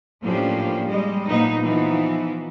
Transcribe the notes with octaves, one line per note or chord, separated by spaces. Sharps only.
A2 F3 A#3 C#4 D4 G4
G3 G#3 D#5
A#2 F3 A#3 B3 D#4
E3 F3 B3 D#4